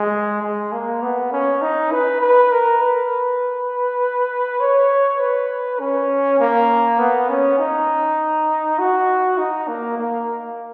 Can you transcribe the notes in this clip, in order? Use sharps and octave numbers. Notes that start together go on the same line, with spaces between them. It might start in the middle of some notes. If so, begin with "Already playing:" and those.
Already playing: G#3
G#3
A#3
B3
C#4
D#4
B4
B4
A#4
B4
C#5
B4
C#4
A#3
B3
C#4
D#4
F#4
D#4
A#3
A#3